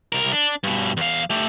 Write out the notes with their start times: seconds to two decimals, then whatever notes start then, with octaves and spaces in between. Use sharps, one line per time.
0.12 C2 A#4
0.32 D4
0.64 G2 B2
0.97 E2 F5
1.30 A3 G4